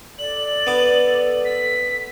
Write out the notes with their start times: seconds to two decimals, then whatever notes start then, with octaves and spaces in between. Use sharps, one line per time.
0.19 A4 D5 F#7
0.67 B3 D6
1.45 B6